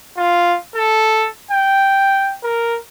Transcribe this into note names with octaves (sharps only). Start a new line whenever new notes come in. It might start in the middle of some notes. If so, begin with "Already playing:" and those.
F4
A4
G5
A#4